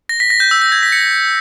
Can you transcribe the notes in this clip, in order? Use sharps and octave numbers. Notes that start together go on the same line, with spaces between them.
A#6
B6
A#6
G6
E6
G6
G#6
B6
C#7